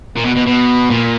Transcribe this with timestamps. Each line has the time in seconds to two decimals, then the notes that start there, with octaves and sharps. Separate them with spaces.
0.16 A#2
0.25 B2
0.35 B2
0.46 B2
0.90 A#2